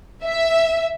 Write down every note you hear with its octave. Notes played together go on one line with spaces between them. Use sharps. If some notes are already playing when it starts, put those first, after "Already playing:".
E5